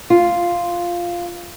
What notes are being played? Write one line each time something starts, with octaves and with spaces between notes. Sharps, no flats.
F4